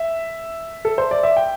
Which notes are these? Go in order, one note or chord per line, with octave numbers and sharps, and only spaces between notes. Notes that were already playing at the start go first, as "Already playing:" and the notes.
Already playing: E5
A4
C5
D5
E5
G5